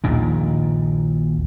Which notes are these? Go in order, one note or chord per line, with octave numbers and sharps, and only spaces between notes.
A#1 D#2 A#2 D#3